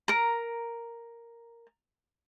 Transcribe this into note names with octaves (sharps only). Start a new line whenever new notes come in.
A#4 A#5